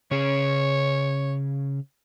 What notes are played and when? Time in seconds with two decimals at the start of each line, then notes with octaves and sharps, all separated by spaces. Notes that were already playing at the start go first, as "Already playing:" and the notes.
0.11 C#3 C#4 G#4 C#5